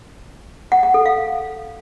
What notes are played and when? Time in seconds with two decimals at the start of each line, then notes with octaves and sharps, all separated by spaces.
0.72 F#5
0.83 F#5
0.94 A4
1.06 F5